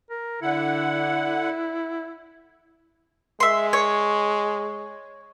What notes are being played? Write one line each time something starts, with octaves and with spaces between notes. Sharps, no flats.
A#4
D3 E4 F#5
G#3 E5 C6
C#5